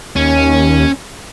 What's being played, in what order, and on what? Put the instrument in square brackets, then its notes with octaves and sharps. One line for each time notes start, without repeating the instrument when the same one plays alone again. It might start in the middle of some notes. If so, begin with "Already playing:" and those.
[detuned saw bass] D#2 [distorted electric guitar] C#4